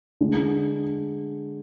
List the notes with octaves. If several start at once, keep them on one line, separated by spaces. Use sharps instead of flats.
D3 G#3 D4